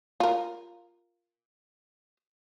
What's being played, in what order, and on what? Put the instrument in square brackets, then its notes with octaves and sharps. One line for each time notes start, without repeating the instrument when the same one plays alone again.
[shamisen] F4 A#4